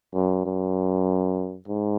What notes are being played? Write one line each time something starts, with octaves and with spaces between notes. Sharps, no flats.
F#2
F#2
G#2